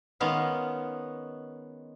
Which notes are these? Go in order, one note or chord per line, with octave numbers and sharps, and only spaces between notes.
D#3 G#3 B3 C#4 F5